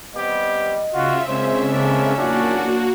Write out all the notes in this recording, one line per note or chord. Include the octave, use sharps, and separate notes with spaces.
G3 B3 C4 G4 D#5
C#3 F4 F#4 E5
A#2 G#3 C4 C#4 C5
A2 A#3 C#4 D4
E2 A#2 F#3 A#3 D4 F#4